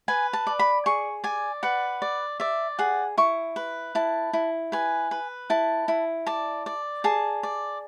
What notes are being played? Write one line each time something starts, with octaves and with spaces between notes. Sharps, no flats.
B4 G#5
A5
D5
B5
G#4 C#6
D5 G#5
B4 F#5
D5
D5 E5
G#4 F#5
E4 C#6
B4
E4 A5
E4
B4 G#5
B4
E4 A5
E4
D5 A5
D5
G#4 A5
D5